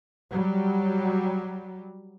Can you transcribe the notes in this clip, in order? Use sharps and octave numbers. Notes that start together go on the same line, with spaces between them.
F#3 G3